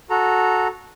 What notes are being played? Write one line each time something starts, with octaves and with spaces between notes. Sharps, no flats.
F#4 A4 A#5